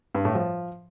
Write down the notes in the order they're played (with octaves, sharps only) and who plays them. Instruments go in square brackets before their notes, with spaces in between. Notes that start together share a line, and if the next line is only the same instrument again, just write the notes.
[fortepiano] G2
A2
F3